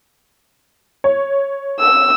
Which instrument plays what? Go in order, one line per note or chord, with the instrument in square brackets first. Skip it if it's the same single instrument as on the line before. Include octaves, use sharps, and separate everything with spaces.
[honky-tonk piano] C#5
[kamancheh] E6